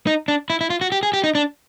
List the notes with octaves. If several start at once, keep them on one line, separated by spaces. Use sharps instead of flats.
D#4
D4
E4
E4
F4
F#4
G4
G#4
G4
D#4
D4